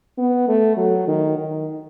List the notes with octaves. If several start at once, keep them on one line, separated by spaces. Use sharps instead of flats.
B3
A3
F#3
D#3
D#3